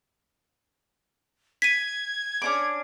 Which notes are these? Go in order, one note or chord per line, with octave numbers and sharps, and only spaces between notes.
G#6 B6 D#7
C#4 D4 D6